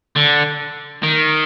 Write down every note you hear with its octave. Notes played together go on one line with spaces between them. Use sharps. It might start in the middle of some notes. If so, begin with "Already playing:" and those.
D3
D#3